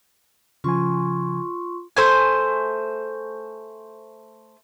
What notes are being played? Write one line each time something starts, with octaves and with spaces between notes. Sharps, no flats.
C#3 F3 F4 G#5 C6 C#6
A3 C5 G#5